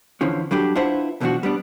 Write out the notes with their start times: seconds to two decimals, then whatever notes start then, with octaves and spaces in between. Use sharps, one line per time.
0.21 E2 D3 E3 F3 C#4
0.51 F#3 G3 D4 G4 A4
0.75 D4 E4 F4 B4 C5 F#5
1.20 B1 B2 E3 F3 D4 F#4
1.43 G3 B3 D4